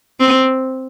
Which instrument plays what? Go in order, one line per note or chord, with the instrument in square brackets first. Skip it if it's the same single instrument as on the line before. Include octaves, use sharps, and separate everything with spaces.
[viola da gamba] C4